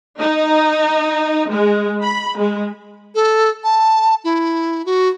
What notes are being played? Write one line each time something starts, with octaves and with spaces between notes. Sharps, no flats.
D#4
G#3
B5
G#3
A4
A5
E4
F#4